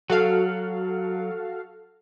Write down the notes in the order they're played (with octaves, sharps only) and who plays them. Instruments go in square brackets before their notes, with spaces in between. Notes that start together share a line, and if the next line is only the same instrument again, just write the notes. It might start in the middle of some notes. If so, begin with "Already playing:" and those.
[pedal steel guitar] F#3 [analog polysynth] F#4 A4 F5